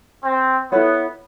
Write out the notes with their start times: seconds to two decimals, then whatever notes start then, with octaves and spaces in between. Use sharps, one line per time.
0.23 C4
0.71 B3 E4 A4 C#5 F#5